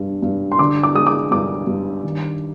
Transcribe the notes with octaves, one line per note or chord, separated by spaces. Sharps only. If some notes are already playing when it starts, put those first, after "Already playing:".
Already playing: G2 G#3
G2
C6
D3 D6
D6
G#3 D#6
D6
G2 D6
G2
D#3